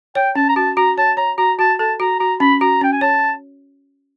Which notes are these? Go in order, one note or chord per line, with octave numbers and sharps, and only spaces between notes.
C#5 G5
C#4 A5
A#5
F#4 A5
F#4 A#5
C#5 A5
C#5 A#5
F#4 A#5
F#4 A5
A4 A5
F#4 A#5
F#4 A#5
C#4 B5
F#4 A#5
C#4 G5
G#5
C#5 A5